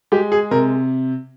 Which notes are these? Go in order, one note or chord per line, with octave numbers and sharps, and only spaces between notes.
G#3 G4
G#4
C3 A#4